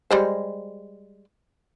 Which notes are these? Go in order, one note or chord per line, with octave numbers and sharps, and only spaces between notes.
G3 G#3 C5